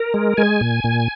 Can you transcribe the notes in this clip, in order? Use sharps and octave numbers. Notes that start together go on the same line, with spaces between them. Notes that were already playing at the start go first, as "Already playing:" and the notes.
Already playing: A#4
G#3
G#3 G#5
A#2
A#2